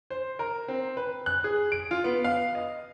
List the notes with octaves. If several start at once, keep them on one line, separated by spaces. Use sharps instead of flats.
C5
A#4
C4
B4
F#6
G#4
D7
F4
B3
F5
D#5